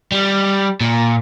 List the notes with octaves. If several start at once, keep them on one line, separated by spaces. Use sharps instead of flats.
G3
A#2